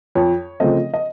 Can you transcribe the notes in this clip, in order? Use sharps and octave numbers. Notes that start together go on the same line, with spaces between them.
F2 C#5
C#3 F3 A3 C4 D#5
D#5